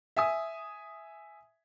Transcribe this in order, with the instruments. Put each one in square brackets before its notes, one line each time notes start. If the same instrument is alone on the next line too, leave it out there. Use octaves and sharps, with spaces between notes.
[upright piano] E5 G#5 D#6